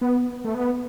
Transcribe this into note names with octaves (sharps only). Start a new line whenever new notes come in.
B3
A3
B3